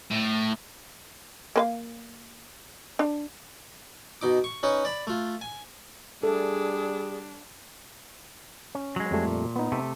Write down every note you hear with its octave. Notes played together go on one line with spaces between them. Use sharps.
A2
A#3 B4 F5
D4
B2 D#4 D6
C#6
C#4 D#4 B4 C#5
D5 B5
A3 F4
G#5
G3 D4 G#4 A4
C#4
F#3 G#3
F2 G3 A3
A#2
B3 D#4
C3 A3